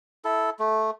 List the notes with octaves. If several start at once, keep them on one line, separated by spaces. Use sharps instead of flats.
E4 A4
A3